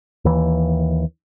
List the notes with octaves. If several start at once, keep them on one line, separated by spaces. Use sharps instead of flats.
D#2 E3